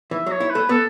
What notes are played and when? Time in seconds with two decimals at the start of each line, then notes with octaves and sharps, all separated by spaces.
0.11 E3 E5
0.27 F#3
0.31 C#5
0.40 E4
0.50 B4
0.55 A3
0.69 B3 A4